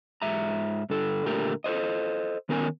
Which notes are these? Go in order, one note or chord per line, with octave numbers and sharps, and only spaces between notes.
G#2 E5 A#5
G2 D3 A4
A#2 D3 A3 G4 A#4
A4 B4 C5 D#5
D#3 B3 C#4 A#4 C#5 G#5